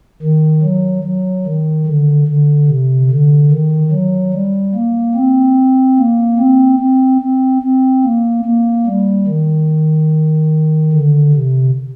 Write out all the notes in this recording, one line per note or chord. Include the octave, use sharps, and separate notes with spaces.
D#3
F#3
F#3
D#3
D3
D3
C3
D3
D#3
F#3
G3
A#3
C4
A#3
C4
C4
C4
C4
A#3
A#3
G3
D#3
D3
C3